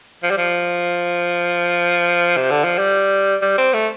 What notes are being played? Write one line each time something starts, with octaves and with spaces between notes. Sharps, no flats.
F3
G3
F3
C3
D3
F3
G3
G3
C4
A3